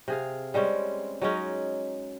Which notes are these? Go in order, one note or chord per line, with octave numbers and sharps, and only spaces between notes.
C3 G#4 F5
G3 G#3 C4 C#4
F#3 G#3 C#4 D#4